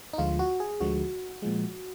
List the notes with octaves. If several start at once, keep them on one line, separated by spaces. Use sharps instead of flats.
D#4
D2 D3 F3 G#3 F4
F#4
G#4
D2 D3 F3 G#3 F#4
A#2 F3 G#3